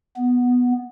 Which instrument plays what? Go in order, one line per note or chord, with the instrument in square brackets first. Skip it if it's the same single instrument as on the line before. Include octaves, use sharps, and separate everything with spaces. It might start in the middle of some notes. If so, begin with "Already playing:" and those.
[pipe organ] B3